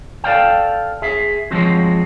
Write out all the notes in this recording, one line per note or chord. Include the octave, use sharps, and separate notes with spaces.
A4 D5 F5 G5
G#4 E5
F3 F#3 G#3 C4 F#4